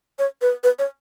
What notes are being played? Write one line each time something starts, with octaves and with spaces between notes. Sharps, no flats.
C#5
B4
B4
C#5